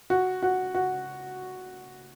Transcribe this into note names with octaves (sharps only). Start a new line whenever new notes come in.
F#4
F#4
F#4